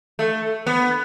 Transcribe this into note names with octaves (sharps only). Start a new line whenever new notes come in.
A3
B3